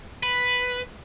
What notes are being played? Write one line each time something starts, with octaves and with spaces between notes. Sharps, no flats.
B4